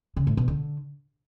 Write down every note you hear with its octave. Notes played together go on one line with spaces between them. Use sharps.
C#3
A2
B2
D3